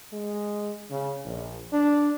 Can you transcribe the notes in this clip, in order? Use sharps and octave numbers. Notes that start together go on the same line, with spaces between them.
G#3
C#3
A#1
D4